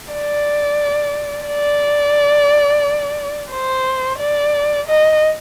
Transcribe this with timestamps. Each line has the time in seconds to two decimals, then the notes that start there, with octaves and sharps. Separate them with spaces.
0.13 D5
1.48 D5
3.51 C5
4.19 D5
4.87 D#5